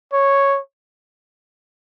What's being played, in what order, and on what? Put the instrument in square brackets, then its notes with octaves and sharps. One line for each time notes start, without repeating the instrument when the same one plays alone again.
[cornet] C#5